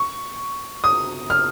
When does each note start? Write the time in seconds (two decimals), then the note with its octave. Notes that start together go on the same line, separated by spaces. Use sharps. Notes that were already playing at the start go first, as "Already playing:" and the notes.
Already playing: C#6
0.84 D#6
1.30 F6